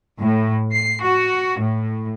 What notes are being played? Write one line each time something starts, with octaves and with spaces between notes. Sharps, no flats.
A2
C7
F#4
A2